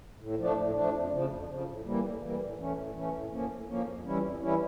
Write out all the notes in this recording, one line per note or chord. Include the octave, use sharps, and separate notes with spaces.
A2
F3 A3 D4
A2
F3 A3 D4
F2
C#3 F3
F2
C#3 F3
A2
E3 G3 A#3
A2
E3 G3 A#3
A2
E3 A3 C#4
A2
E3 A3 C#4
A2
F3 A#3 C#4
A2
F3 A#3 C#4
F2
E3 G3 C#4 E4
F2
E3 G3 C#4 E4